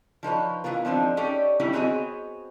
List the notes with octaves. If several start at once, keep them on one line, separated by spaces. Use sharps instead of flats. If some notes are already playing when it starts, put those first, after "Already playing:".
F3 D#4 B4 C#5
E3 F3 B3 F4 A#4
F3 G#3 C4 D4 D#4
C#4 D#4 G4 A4 C#5 D5
G3 C#4 D#4 E4 G4
B3 C4 F#4 G#4 C#5 D#5